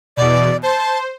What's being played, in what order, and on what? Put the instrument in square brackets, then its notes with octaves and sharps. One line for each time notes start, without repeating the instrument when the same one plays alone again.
[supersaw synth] E2 B2 [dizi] D5
[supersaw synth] C5 [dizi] A5